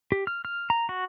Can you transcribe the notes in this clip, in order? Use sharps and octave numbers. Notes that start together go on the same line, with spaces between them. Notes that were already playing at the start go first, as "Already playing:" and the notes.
G4
F6
F6
A#5
F#4